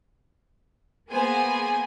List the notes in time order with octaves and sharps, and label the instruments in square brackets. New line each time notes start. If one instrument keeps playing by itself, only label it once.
[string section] A#3 B3 G#4 C5 G#5